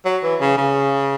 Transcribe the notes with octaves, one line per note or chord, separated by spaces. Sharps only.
F#3
E3
C#3
C#3